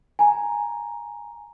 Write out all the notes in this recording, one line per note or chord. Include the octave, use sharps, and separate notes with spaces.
G#5 A#5